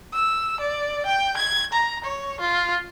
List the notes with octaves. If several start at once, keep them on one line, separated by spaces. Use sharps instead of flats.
E6
D5
G5
G#6
A#5
C#5
F4